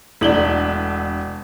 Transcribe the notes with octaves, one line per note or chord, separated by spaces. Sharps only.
E1 A3 B3 D4 E4 D5 F#7 G7